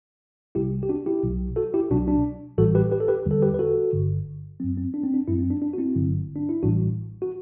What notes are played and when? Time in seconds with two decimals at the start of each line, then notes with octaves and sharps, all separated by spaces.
0.55 C2 C3 G3 E4 G4
0.83 G4
0.89 D4 F#4
1.06 E4 G4
1.23 B1 B2 F#3
1.56 F#4 A4
1.74 E4 G4
1.90 C2 B2 F#3 D4 F#4
2.08 D4
2.58 A1 A2 E3 G3 F#4 A4
2.75 G4 B4
2.91 G4 B4
3.00 A4
3.08 G4 B4
3.26 E2 D3 G3
3.31 A4
3.42 G4 B4
3.54 B4
3.59 F#4 A4
3.93 G1 G2 D3
4.60 F#2 F#3 C4
4.77 C4
4.94 D4
5.04 C4
5.14 D4
5.28 F#2 C4 E4
5.31 F#3
5.39 C4
5.50 D4
5.62 D4
5.73 F#4
5.78 C4 E4
5.95 G1 G2 D3 F#3
6.36 D4
6.49 E4
6.63 A1 A2 E3 G3 D4 F#4
7.22 F#4